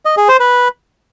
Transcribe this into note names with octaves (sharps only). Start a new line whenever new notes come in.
D#5
G#4
C5
B4